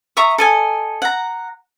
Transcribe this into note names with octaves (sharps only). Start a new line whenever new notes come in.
E5 A#5 C#6 D#6
A4 D#5 G#5
F#5 A#5